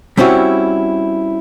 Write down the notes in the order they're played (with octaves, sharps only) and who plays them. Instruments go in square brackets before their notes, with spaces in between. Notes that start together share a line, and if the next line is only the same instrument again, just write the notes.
[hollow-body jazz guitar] G3 C4 C#4 E4 F#4